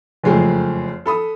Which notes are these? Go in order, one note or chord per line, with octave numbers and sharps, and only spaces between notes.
F#1 F2 G#3 A3 G#4
A4 B5 D#6